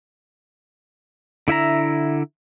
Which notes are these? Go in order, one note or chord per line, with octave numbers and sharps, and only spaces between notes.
D3 E4 E5 A#5